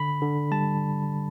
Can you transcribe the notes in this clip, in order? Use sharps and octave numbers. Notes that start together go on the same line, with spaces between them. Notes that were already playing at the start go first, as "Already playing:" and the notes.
Already playing: D3 B5
D3
G3 A5